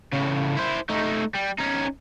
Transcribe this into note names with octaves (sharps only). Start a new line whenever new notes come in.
A2 C#3
E4 C5
A3 D#4
G3
C#4 D#4